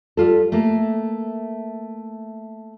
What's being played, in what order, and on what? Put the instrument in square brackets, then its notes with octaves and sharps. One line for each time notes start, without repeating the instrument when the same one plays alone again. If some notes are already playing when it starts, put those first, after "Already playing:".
[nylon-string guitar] G3 F4 A4
A3 A#3